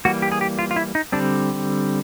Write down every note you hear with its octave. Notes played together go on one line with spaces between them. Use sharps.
E3 G3 A#3 F#4
G4
G#4
G4
F4
F4
E4
D#4
D3 G3 C4 D4